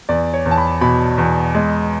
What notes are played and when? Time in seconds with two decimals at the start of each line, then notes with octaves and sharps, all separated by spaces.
0.09 E2 D5
0.34 C#5
0.46 E2
0.51 A5
0.58 B5
0.81 B2 B5
1.18 E2
1.55 G#3